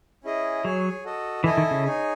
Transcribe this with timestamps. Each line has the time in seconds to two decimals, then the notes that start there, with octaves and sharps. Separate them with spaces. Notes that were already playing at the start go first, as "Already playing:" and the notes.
0.24 C#4 E4 G#4 D#5
0.64 F#3 G#4 C#5 G#5
1.04 F#4 A4 D#5
1.44 E3 E4 A4 D#5 G#5
1.57 D#3
1.71 C#3
1.84 D#4 G#4 C#5 G#5